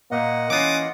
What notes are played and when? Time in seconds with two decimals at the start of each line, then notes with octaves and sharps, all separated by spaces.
0.11 A#2 A#3 D#5 F#5
0.50 E3 A#3 C#4 F4 D6 D#6